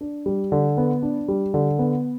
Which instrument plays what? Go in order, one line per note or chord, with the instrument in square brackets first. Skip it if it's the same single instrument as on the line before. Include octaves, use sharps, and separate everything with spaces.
[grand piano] D4
G3
D3
B3
D4
G3
D3
B3